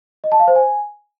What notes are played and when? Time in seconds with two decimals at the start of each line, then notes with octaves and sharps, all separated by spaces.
0.24 D#5
0.32 A5
0.40 F5
0.48 C5
0.56 G#5